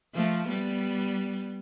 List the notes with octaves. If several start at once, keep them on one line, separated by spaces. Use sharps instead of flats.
F3 A3
G3 B3